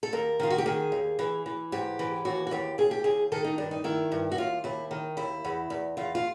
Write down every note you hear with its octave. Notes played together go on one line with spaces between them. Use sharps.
A4
D#2 A#4
D#3 F4
F#4
G4
D#3 G#4
D#2
E3
E3
G#2 G4
E3
D#2 F#4
F#4
D#2 G4
D#2 G#4
G4
D#2 G#4
D#3 A4
D#4
G2 D4
D#4
D#3 E4
G2
F#4
D#2 F4
D#2 E4
D#3
D#2 E4
E2
E2
E2 F4
F4